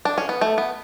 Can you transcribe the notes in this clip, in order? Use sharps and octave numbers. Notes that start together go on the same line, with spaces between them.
D4
C#4
B3
A3
B3